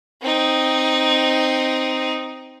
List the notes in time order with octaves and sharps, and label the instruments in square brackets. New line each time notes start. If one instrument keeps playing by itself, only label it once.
[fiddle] C4 D#4